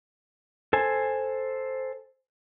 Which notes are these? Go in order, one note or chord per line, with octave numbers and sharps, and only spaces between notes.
A4 C5 G#5